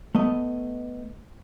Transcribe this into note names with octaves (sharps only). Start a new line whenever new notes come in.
A3 B3 D#5